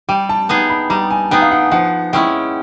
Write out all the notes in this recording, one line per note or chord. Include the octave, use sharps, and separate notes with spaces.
G3 G5
A5
B3 D#4 G#4
B5
G3 A#5
G#5
B3 D#4 G#4 G5
F5
F#5
F3 F#5
G#3 C#4 E4 G5